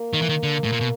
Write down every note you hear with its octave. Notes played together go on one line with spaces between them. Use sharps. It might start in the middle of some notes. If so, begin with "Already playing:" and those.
Already playing: A#3
D#3
E3
D#3
D3
A2
A#2
B2